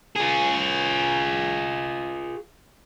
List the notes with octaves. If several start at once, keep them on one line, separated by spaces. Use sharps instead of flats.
F4 G#4